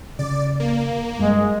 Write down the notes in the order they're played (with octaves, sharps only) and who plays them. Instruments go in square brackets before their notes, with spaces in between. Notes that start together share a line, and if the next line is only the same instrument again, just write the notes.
[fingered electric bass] C#3 [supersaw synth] D5
[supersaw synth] A#3
[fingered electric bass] G2 [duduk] G#3